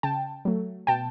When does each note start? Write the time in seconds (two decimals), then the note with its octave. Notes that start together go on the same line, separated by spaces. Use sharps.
0.03 C#3 G5 A5
0.45 F#3 A3
0.87 B2 G5 A5